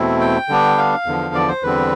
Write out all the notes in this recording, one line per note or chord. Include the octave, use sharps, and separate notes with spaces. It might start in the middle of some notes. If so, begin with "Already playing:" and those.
Already playing: E2 B2 A3 C4 E4
G5
D3 G3 B3 D4
F5
E2 D3 F3
D5
C5
E2 D3 G3 C4 B4